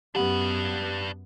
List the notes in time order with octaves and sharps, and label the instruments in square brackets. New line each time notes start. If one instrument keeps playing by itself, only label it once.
[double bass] F#2 B3 [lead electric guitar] D4 B4 [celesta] G4 F#5